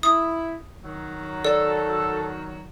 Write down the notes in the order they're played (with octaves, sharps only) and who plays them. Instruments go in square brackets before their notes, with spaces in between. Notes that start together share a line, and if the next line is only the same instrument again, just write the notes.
[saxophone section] E4 [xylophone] D#6
[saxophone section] D#3 F#3
[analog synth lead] A4 [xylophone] D5